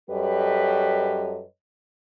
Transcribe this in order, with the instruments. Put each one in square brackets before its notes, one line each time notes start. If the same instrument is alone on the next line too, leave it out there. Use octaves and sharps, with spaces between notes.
[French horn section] F#2 G3 A4 B4 C#5 D#5